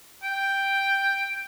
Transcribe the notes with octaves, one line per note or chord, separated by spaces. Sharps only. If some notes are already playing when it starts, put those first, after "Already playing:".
G5